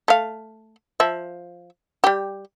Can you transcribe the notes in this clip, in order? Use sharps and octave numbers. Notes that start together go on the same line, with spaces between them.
A3 F5
F3 E5
G3 G4